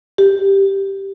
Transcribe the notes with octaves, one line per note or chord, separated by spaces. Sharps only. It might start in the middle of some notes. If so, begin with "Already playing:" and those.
G4